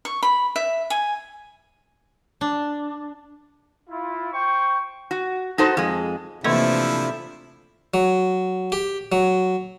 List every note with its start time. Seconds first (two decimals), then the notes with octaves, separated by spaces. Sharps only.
0.05 C#6
0.23 B5
0.56 E5
0.90 G#5
2.41 D4
3.89 E4 F4
4.33 C5 G5 C#6
5.11 F#4
5.58 D#4 F#4 A4 C5
5.77 F2 G#3
6.44 C3 E3 F3 A3 A#3 D4 E4 D#5
7.94 F#3
8.72 G4
9.12 F#3